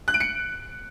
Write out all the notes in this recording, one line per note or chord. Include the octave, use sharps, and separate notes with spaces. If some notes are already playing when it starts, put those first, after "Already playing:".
F#6
D7
C#7